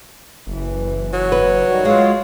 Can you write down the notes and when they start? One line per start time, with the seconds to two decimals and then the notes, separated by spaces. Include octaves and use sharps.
0.47 F#1 E3
1.13 F#3
1.32 B4
1.66 D#3 G3 F#4
1.85 G#3 F4 C#5 F5